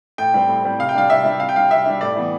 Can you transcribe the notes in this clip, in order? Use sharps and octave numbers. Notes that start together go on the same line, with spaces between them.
A2 G5
G3 C4
A2
G3 C4
C3 F5
G5
G3 D4 F5
C3 E5
G3 D4
C3 F5
G5
G3 D4 F5
C3 E5
G3 D4
A2 D5
E3 B3